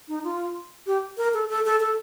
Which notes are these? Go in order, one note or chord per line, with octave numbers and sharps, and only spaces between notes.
D#4
F4
G4
A#4
A4
A4
A4
A4